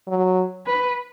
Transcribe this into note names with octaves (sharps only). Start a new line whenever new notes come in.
F#3
B4